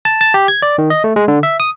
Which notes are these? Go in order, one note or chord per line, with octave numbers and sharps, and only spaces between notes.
A5
A5
G4
G#6
D5
D#3
D#5
A3
G#3
D3
E5
D#6